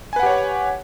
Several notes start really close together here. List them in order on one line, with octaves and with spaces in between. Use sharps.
G#5 B4 F#5 G4 C#5